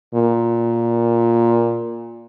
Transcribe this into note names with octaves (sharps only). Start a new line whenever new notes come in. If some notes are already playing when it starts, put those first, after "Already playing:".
A#2